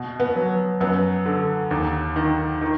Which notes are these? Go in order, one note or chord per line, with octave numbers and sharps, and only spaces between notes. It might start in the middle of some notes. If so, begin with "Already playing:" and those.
Already playing: B2
B3
F#3
F#2 B3
D3
D#2
D#3
D#3